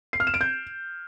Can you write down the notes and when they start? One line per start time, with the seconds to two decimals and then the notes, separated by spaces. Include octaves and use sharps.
0.13 C7
0.20 F6
0.27 E7
0.34 D7
0.41 G6